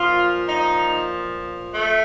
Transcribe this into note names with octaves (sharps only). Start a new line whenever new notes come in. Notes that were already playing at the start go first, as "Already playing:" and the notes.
Already playing: A#2 F3 F4
D#4
A3